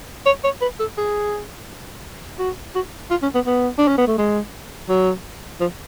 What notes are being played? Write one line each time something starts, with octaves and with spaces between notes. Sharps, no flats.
C#5
C#5
B4
A4
G#4
F#4
F#4
F4
C#4
B3
B3
D4
C#4
B3
A3
G#3
F#3
F3